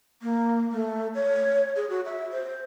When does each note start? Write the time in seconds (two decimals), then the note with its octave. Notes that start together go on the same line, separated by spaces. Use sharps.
0.22 A#3
0.72 A3
1.15 C#5
1.76 G#4
1.90 F#4
2.05 E5
2.32 C5